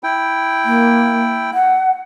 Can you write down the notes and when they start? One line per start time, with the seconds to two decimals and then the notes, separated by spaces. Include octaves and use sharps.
0.03 E4 G5
0.65 A#3
1.54 F#5